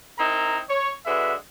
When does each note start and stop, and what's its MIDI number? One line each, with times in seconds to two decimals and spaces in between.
0.19 0.59 60
0.19 0.59 63
0.19 0.59 64
0.19 0.59 70
0.19 0.59 82
0.70 0.92 73
1.06 1.34 50
1.06 1.34 56
1.06 1.34 66
1.06 1.34 71
1.06 1.34 76